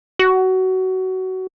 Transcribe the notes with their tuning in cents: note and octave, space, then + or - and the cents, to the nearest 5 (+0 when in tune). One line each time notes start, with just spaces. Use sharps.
F#4 +20